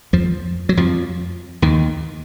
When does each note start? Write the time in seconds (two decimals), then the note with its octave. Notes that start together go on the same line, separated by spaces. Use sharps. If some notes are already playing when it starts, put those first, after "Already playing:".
0.13 F2 F3
0.69 F#3
0.77 F2 F3
1.62 D#2 D#3